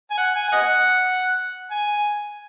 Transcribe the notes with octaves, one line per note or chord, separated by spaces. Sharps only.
G#5
F#5
G#5
G#5
D#5 F#5
G#5